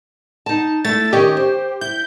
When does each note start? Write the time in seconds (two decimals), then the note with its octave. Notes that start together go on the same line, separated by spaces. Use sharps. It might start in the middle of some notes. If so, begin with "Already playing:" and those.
0.46 D#4 A5
0.85 A3 E4 A6
1.13 D#3 C#4 G4 D#5
1.37 C5
1.81 E4 G6